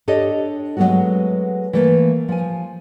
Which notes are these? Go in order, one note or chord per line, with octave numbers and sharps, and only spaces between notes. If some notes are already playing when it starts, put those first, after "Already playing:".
D4 G4 A4 C#5 D#5
F#3 G#3 A3 B3 F#4
E3 A3 A#3
F3 G#5